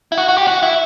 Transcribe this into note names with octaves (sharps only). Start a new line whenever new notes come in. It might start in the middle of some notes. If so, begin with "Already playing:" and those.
E4
F#4
F#4
G4
F#4
E4